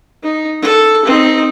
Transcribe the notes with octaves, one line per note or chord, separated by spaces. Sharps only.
D#4
A4
C4 D#4